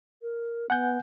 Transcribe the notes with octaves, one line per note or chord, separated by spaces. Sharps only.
A#4
B3 F#5 G#5 G6